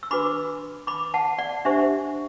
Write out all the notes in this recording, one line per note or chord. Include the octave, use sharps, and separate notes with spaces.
E6
D4 F#4 B4 B5 D6
B5 D6
F#5 A5
D5 F#5
D4 G4 C5 E5